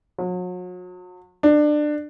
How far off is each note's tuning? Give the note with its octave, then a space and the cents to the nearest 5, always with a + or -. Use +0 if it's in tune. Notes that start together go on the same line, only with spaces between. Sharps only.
F#3 -40
D4 +25